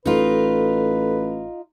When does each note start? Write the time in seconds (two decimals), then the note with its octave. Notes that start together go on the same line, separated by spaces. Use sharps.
0.06 A1 D#4 F4 A4 B4